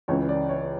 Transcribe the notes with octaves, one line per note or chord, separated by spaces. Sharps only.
C#2 C#3 E3 C#5
D5
C#5